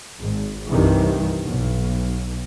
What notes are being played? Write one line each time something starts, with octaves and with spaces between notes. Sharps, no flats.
G#1
C2 G2 C3 D#3 E3
B1